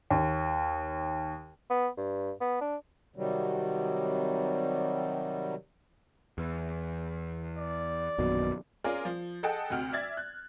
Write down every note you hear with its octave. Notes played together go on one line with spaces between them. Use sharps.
D#2
B3
G2
B3
D4
C3 D#3 F#3 G3
E2
D5
A#1 F#2 B2 D#3
C#4 F4 G#4 A#4 D5
F3
G#4 A4 D#5 F#5 G5 A5
D2 C3 F#4 F#5 G5 F6
D5 E5 G#6 A6
F#6